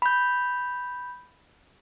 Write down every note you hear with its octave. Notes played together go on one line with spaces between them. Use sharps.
B5 G6